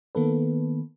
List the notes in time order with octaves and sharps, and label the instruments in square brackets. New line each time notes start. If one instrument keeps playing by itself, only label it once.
[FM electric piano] D#3 A#3 B3 A4 B4